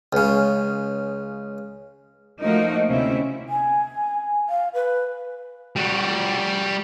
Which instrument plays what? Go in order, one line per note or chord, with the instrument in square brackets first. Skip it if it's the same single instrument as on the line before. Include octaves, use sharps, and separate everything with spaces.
[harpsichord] C#2 C#3
[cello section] F3 A3 A#3 D#4 F#4 A#4
D2 C3 C4 C#4 E4 E5
[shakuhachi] G#5
F5
B4
[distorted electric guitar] G3 F#4